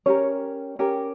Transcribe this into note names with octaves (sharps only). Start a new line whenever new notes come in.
C#4 G4 A#4 C#5
C#4 G4 A#4